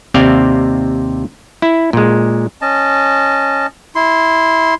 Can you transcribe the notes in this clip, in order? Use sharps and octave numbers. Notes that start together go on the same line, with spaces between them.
D#2 C3 C4 D5 F5
E4
A#2 G#3
C#4 D#5 A5
E4 C6